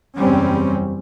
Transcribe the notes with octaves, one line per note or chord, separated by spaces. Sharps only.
F#1 E2 G3 C4 C#4